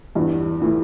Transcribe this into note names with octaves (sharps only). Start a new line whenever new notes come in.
E2 G2
A2 E3